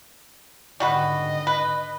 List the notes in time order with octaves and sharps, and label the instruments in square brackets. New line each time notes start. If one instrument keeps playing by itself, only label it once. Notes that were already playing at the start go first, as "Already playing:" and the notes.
[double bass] G#1 D3 [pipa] G3 F#4 B4 [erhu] D#5
[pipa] B4